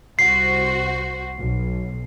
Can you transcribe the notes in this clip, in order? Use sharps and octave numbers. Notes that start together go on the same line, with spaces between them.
C2 F#4 C5 C7
B1